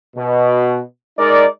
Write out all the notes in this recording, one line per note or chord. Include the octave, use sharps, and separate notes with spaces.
B2
G#3 D#4 A#4 D5